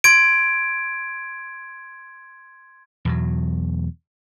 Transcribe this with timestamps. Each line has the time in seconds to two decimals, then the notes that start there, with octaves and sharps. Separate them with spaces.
0.04 C6 G#6 D7
3.05 E2 B2 F#3